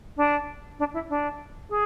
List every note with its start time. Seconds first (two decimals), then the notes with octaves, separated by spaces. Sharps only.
0.17 D4
0.79 D4
0.94 E4
1.09 D4
1.70 G#4